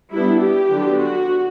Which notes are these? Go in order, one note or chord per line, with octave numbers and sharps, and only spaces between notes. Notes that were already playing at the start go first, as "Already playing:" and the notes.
G3 B3 D4 E4
G4
D3 F#3 B3 D4
F#4